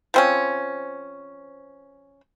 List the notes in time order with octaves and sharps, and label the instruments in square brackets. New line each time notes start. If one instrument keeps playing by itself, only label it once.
[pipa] F3 C4 C#4